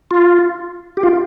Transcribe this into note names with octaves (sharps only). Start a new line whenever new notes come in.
F4
G4
F4